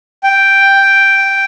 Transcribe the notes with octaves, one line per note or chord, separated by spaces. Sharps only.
G5